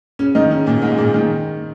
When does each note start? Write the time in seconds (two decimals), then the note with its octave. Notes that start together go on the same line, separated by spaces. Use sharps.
0.19 C#3 C#4
0.35 D#3 D#4
0.51 C#3 C#4
0.66 A#2 A#3
0.82 G#2 G#3
0.97 A#2 A#3
1.14 D#3